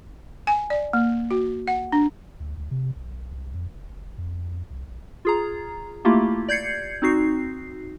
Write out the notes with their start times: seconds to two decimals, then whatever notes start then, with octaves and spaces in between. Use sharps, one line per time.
0.47 G#5
0.70 D5
0.93 A#3
1.31 F#4
1.67 F#5
1.92 D4
2.40 D2
2.57 D2
2.71 C3
2.96 B1
3.33 C2
3.54 F2
3.75 F1
3.89 F#1
4.18 F2
4.70 C2
4.88 A#1
5.25 F4 G#4 A#5
6.05 A3 A#3 E4 F4 G4
6.48 D5 G6 G#6 C7 C#7
7.02 C4 D#4 F#4 C7